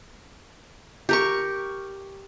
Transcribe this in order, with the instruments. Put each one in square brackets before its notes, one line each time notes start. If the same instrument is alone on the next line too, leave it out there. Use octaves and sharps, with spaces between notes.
[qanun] G4 A#4 C#6